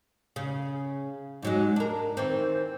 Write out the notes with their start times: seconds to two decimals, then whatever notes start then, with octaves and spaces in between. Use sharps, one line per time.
0.36 C#3
1.42 G#2 F#3 G#3
1.76 D4 A#4
2.17 D#3 E3 C4